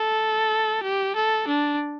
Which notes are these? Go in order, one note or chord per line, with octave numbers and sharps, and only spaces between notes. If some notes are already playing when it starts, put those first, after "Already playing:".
Already playing: A4
G4
A4
D4